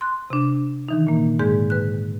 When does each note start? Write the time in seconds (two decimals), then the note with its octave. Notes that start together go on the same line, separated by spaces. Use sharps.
0.01 C6 F#6
0.30 C3 D4
0.89 D#3 E3 D#4
1.07 A#2 A#3
1.39 G#2 D3 G#3 G#4 G6
1.70 B4 F#6